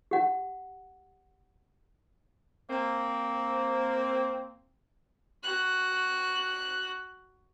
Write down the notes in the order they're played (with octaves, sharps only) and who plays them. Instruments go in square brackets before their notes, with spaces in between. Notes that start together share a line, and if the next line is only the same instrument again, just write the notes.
[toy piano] G4 F#5
[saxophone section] A#3 C4
[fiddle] F#4 F#6